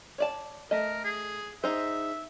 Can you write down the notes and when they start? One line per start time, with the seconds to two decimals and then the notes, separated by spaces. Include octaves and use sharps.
0.18 C#5 D5 A5
0.71 A3 A#4 D#5
1.04 G#4
1.64 D#4 G#4 C5 E5